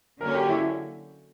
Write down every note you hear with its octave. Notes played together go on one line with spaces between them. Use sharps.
D3 F#3 A#3 C#4 A#4
G4
E4